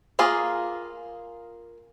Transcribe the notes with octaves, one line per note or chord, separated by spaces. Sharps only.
A#3 F4 G#4